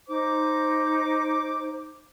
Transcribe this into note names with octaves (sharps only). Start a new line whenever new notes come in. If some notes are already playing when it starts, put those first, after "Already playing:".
D#4 C5 D6